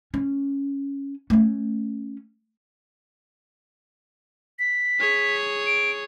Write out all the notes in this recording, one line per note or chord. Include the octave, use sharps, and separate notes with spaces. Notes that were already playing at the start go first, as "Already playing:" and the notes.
C#4
A3 C#4
B6
G#4 C#5
D7